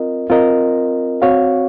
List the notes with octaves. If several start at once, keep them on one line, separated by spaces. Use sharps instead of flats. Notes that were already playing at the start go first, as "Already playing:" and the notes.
Already playing: C4 F4 A#4 D#5
C4 F4 A#4 D#5
C4 F#4 C#5 F5